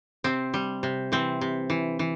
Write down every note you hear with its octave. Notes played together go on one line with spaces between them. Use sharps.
C3 C4
G3
C3
E3 C4
C3
E3
E3